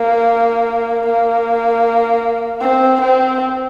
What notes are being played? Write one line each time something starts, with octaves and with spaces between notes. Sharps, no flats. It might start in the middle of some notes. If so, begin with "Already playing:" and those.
Already playing: A#3
A#3
C4
C4